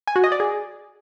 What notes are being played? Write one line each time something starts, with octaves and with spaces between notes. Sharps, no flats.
G#5
F#4
D#5
D5
G#4